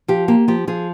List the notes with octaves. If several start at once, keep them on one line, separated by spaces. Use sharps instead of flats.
F3 G4
A#3 G4
F3 G4
F3 G#4